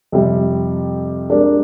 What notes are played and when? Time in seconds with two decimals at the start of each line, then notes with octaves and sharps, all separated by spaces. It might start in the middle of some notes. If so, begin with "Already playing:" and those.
0.12 F2 C3 G3
1.30 G#3 D4 G4 A#4 D5